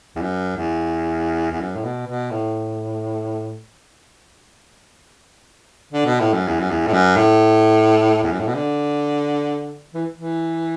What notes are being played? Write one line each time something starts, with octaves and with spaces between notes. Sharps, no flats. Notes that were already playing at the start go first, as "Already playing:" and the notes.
E2
F#2
E2
E2
F#2
A2
B2
B2
A2
D3
B2
A2
F#2
E2
F#2
E2
A2
F#2
A2
E2
F#2
A2
B2
D3
E3
E3